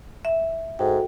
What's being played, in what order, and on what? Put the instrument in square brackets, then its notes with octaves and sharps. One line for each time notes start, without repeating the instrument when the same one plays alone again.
[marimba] E5
[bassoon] G#2 [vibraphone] F#4 A4 [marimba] G5